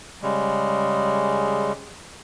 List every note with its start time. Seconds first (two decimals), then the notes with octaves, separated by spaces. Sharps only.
0.22 C#3 G3 G#3